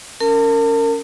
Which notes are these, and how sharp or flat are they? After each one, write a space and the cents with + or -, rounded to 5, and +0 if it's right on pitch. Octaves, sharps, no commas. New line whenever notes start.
C#4 +15 A#4 -25 A5 +35